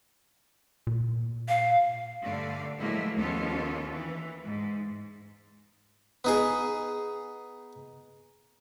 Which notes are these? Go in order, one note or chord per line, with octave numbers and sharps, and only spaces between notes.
A#2
F5
G2 D3 A3 D5 F5
A2 F3 F#3 G#3 A#3 E4
D#2 F3 B3 C#4 F4 A4
E3
G#2
B3 D#4 G#4